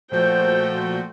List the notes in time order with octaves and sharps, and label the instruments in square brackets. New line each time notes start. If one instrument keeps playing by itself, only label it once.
[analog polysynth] A#2 F3 F#4 [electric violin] A3 G5 [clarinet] C5